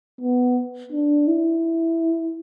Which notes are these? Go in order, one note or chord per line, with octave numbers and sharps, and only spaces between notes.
B3
D4
E4